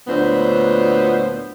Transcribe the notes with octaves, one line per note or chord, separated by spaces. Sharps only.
D2 A#2 F#3 B3 D4 C5